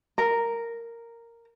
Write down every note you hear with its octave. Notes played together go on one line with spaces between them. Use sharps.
A#4